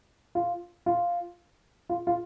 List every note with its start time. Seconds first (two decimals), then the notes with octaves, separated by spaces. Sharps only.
0.35 F4
0.86 F4
1.89 F4
2.07 F4